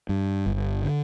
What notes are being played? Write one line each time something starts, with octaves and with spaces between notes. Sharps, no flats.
G2
G1
D3